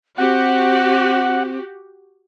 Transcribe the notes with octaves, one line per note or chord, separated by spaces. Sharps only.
C4 F#4 G4 F#5